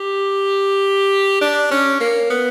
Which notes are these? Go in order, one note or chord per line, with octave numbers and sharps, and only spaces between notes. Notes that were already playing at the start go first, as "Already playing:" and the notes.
Already playing: G4
D4
C#4
A#3
B3